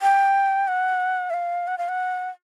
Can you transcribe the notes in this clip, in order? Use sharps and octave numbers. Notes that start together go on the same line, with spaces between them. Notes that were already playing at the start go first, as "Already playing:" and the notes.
G5
F#5
E5
F5
F#5
F5
F#5